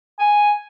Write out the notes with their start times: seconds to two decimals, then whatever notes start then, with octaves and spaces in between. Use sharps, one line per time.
0.19 G#5